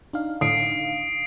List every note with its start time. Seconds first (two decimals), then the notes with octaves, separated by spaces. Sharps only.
0.13 D4 D#4 F5
0.41 A2 D3 D#6 C7 D7